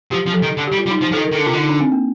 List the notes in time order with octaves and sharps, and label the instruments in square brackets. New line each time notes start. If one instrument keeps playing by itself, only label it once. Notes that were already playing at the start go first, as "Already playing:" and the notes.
[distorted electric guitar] F3 [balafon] G4
[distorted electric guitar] F3
[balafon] A4
[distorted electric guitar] D#3
D3
[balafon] G4
[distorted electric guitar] G3
[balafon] F4
[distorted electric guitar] G3
[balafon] D#4
[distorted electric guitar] F3
[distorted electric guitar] F3 [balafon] A4
[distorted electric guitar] D#3
[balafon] A#4
[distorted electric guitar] D#3
[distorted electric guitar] D3 [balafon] A4
[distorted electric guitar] C3 [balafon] F4
[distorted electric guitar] D3 [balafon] D#4
[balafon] D4
C4
A#3